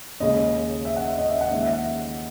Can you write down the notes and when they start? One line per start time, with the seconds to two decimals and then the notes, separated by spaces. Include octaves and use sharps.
0.20 D#2 C#3 G#3 D#5
0.85 E5
0.96 F#5
1.08 E5
1.18 D#5
1.29 E5
1.41 F#5
1.51 D#2 C#3 G#3 D#4 E5
1.63 E5
1.73 F#5